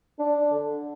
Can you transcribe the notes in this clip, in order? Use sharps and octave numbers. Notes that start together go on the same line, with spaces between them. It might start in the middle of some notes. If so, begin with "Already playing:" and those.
D4
D3